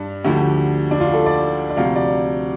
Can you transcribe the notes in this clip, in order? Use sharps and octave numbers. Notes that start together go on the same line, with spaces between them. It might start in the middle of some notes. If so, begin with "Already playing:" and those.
Already playing: G2 D4
D2 D3 F3 G4
D4
F4
A4
D5
D5
D2 C3 F3 F5
D5